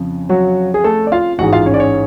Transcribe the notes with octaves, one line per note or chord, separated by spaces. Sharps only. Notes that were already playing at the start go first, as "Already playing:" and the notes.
Already playing: F2 C#3
F#3 F#4
G#4
A3 A4
D5
F4 F5
A1 G#2 G#3 F#4 F#5
F4 F5
C#4 C#5
D5
C#4 C#5